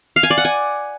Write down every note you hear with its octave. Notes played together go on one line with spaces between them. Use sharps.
F5
G#5
D5
F#5
G#5